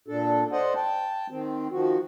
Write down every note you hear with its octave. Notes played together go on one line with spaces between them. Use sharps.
A#2 D4 A4
C5 D5 D#5 F#5
G5 A5
D#3 C4
D#3 F3 F#4